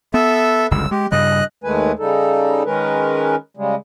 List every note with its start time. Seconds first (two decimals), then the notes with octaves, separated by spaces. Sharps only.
0.14 B3 A4 E5
0.71 G1 C#2 F#2 E6
0.91 G#3 G4
1.12 G2 C#3 G3 D#5 F#6
1.64 D#2 D#3 G#3 A3 B4 G#5
1.99 C#3 G3 D#4 A4
2.66 D#3 G#3 C#4 A#4 B4
3.57 C#3 G3 G#3